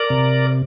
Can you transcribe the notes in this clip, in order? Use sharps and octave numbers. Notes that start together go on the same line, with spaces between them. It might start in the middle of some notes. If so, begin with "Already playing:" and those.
Already playing: A#4 D5
C3